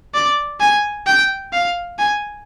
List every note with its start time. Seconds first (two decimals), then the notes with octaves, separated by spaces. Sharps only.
0.14 D5
0.60 G#5
1.07 G5
1.53 F5
1.99 G#5